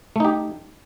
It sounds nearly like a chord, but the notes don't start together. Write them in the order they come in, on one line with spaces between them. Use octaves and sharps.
A3 D#4 G4